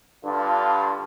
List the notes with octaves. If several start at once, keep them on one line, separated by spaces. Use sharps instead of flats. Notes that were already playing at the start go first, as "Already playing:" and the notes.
G2 D3 F4